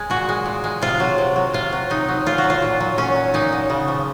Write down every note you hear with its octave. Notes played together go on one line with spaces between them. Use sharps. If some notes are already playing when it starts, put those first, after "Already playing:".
Already playing: G#3 G#4
A#2 F#4
G#3
A#2
G#3
C3 F4
F#3
C3
F#3
C3 F4
F#3
C3 D#4
F#3
A#2 F4
F#4
F#3
F4
A#2
F#3
A#2 C#4
F#3
A#2 D#4
F#3
C#3
F3